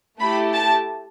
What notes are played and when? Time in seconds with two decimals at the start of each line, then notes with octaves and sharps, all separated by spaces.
0.20 A3 E4 G4 B5
0.54 A5